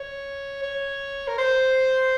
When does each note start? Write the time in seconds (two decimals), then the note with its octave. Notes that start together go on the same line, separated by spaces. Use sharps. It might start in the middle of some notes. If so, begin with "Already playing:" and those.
Already playing: C#5
0.63 C#5
1.28 A#4
1.38 C5